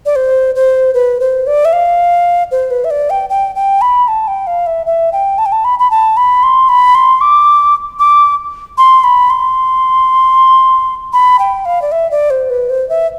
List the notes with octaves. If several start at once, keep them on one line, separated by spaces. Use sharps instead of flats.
D5
C5
C5
B4
C5
D5
E5
F5
C5
B4
E5
D5
G5
G5
G5
B5
A5
G5
F5
E5
E5
G5
A5
G5
A5
B5
B5
A5
B5
C6
B5
C6
D6
D6
C6
B5
C6
B5
G5
F5
D5
E5
D5
C5
B4
C5
E5